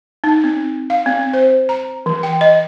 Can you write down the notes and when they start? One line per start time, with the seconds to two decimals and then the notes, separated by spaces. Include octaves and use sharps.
0.24 D#4
0.44 C4
0.90 F5
1.06 C4
1.33 C5
1.69 A#5
2.06 E3
2.23 G5
2.41 D#5